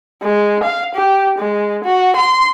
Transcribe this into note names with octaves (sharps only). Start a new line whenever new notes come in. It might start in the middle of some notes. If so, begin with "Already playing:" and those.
G#3
F5
G4
G#3
F#4
C6